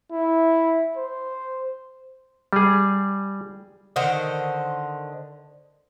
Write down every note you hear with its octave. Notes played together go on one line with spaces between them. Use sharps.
E4
C5
G3 G#4
D3 D#3 C5 D#5